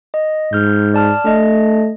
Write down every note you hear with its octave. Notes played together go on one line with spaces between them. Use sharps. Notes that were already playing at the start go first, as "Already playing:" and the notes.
D#5
G#2 F6 G6
D5 A5 F6
A3 D4 D#5